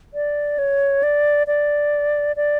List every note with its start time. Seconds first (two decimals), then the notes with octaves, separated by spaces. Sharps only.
0.14 D5
0.58 C#5
1.03 D5
1.47 D5
2.36 D5